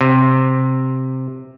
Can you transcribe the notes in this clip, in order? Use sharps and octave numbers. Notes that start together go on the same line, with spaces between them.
C3